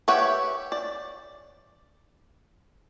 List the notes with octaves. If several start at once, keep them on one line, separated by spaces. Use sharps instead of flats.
G4 B4 C#5 E5 F#5
D5